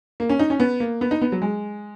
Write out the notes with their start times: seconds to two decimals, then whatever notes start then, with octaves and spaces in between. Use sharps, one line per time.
0.20 A#3
0.29 C#4
0.39 D#4
0.50 C#4
0.60 B3
0.80 A#3
1.01 B3
1.11 D#4
1.22 B3
1.32 F#3
1.42 G#3